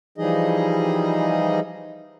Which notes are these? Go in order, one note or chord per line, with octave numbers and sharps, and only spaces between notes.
E3 F3 G3 D#4 G#4 D#5